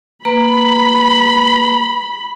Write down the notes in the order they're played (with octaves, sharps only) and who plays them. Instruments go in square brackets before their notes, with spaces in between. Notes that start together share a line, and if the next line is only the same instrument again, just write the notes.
[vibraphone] A#3 B4 A#5 [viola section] B5